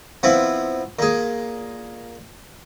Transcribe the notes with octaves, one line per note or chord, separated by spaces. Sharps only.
F3 B3 C4 E4
A#2 G#4